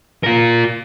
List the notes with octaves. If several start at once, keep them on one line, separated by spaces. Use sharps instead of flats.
F4 A#4